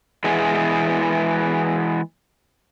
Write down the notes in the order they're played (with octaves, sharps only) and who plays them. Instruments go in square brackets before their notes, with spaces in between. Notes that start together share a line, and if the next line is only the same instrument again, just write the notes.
[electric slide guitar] E3 G#3 B3 E4 G#4